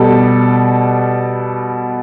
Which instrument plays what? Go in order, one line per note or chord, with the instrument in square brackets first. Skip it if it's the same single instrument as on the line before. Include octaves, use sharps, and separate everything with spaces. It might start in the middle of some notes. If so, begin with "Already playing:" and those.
Already playing: [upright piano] B2 G3 A4